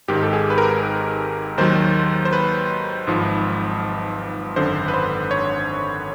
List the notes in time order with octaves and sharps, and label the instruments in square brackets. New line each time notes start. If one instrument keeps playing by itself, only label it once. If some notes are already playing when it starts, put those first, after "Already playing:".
[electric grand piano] G#1 G#2 D#3 G4
A4
G#4
B4
A#4
A#4
B4
D#2 D#3 F#3 C5
C5
B4
G#1 G#2 F3
G#1 F#2 D3 C5
B4
C5
C#5